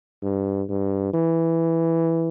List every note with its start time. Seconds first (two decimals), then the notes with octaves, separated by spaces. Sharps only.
0.23 G2
0.70 G2
1.14 E3